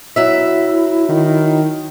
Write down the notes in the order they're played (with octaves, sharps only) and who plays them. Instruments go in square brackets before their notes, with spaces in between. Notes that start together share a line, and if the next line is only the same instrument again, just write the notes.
[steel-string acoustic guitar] F#3 E5 [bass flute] E4
[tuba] D#3